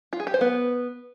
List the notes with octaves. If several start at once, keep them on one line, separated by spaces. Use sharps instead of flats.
F4
G#4
G4
C5
B3